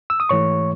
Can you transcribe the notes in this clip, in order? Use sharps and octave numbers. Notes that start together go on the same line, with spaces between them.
E6
D#6
G#2 E3 A3 C#5 C#6